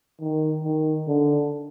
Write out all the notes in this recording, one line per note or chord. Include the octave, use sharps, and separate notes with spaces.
D#3
D#3
D3